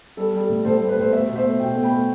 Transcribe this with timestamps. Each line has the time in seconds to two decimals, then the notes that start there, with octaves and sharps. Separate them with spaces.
0.17 G3 A4
0.33 G3
0.41 A4
0.49 A2
0.65 A2 A4 C5
0.77 G3 A4
0.89 B4
0.96 A2 A4 C5
1.12 A3 C5 E5
1.28 B2
1.36 C5 E5
1.44 A3
1.60 B2 E5 G5
1.76 A3
1.83 G5 B5
1.92 A3